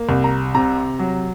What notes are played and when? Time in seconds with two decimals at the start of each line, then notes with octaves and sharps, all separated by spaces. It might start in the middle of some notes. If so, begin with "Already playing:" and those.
Already playing: A#3
0.09 C2
0.24 A#5
0.55 C3 A#5
0.99 F#3